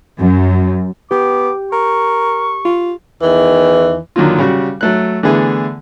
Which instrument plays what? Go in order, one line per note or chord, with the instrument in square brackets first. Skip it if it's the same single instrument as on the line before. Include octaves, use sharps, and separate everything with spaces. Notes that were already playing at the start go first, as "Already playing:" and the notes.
[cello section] F#2
[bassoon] B3 [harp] G4 [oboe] D6
[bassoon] A#4 [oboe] C#6
[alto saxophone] F4
[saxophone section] E2 D#3 E3
[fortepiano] D3 D#3 F#3 A#3 F4
C#3 G3 F#4
F#3 A3 F#6
D3 E3 A3 B3 G#4